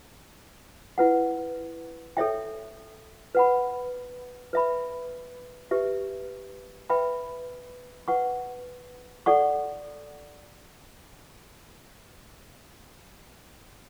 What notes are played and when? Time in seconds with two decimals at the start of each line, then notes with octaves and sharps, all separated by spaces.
0.98 E4 B4 F#5
2.17 A4 C#5 E5 G5
3.35 B4 F#5 B5
4.53 B4 E5 B5
5.71 G4 B4 E5
6.90 B4 E5 G5 B5
8.08 B4 F#5 C#6
9.26 A4 D5 F#5 C#6